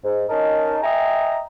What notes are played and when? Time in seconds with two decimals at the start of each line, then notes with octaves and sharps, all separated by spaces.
0.04 G#2
0.30 C#4 D#4 A#4 D#5 A5
0.83 D#5 E5 G5 G#5 A#5